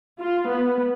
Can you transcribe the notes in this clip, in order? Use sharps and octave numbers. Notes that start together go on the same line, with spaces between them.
F4
B3